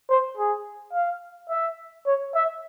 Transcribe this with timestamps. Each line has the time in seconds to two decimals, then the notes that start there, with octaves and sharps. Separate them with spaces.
0.10 C5
0.37 G#4
0.93 F5
1.50 E5
2.06 C#5
2.35 E5